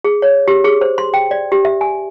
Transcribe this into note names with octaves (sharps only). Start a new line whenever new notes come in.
G#4
C#5
G4
G#4
C5
C6
G5
D5
G4
E5
G#5